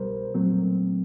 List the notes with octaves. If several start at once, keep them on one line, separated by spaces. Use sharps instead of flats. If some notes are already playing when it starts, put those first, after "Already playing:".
Already playing: C2 B2 G3 A#4 C5
A#2 F#3 A3 C4